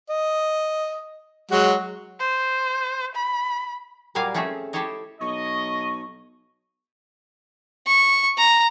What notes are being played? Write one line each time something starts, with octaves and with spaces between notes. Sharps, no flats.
D#5
F#3 G#3 F#4
C5
B5
A#2 F#3 G3 A#4 F5 G#5
A3 C4 C#4 G#4 E5
E4 G4 A4 C5 C#5 D#5
B1 D#5 C#6
C#6
A#5